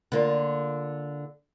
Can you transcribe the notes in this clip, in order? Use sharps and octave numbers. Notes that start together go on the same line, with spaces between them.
D3 A#3 F4